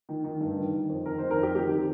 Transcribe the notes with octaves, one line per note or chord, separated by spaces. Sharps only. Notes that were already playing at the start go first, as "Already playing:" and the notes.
D#3
D#3
G2
D#3
D#3
F2
D#3 A#4
C5
D#3
A#4
F2 G4
D#3 G4
D#3